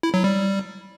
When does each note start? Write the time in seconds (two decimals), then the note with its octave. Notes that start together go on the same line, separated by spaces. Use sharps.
0.03 E4
0.14 F#3
0.24 G3